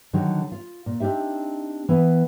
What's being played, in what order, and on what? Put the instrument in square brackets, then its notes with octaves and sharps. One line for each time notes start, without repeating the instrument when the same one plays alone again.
[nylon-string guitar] D3 D#3 F#3
F4
A#2
C4 D4 D#4 G4 E5
E3 B3